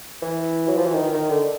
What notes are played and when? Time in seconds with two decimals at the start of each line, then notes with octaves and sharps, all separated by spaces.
0.22 E3
0.68 F#3
0.76 F3
0.86 E3
0.95 D#3
1.13 D#3
1.30 D3